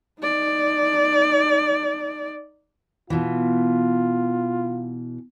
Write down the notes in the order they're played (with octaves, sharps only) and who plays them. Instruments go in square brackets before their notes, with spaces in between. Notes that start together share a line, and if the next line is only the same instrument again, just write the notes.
[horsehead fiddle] D#4 D5
[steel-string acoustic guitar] B2 E3 [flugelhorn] F4